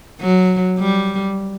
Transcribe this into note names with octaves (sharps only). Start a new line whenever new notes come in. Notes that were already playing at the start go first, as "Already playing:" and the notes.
F#3
G3